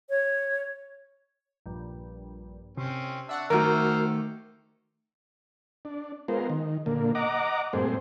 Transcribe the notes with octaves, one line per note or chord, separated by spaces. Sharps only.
C#5
A#1 G2
C3 C4 C#4
D4 E5 F#5 C#6
D#3 A3 F#4 A#4 C5 D6 F6
D4
G#3 B3 F4 A#4 C5
D#3
A#2 D3 A#3
D#5 F#5 A#5 D6
G2 A#2 A3 C4 G#4 C5